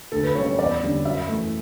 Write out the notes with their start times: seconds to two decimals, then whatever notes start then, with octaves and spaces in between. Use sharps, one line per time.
0.12 D2 A4
0.24 B4
0.35 C#3 G3 C#4 C#5
0.46 C#5
0.58 E2 D5
0.82 D3 G3 C#4
1.05 F#2 E5
1.28 E3 A3